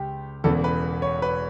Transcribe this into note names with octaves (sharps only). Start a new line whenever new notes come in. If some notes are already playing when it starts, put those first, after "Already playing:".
Already playing: C#2 G4
E1 E2 C#3 E3 A4
B4
C#5
B4